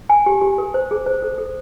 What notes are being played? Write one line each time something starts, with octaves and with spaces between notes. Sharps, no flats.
G#5
G4
G4
A#4
C5
G#4
C5
A4
A4